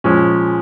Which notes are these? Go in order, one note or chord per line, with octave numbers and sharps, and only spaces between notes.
A#2 F3 G#3 C#4